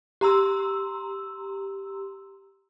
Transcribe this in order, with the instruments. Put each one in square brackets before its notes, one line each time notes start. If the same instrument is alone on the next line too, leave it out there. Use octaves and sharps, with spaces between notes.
[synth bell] G4 A#5 C6 E6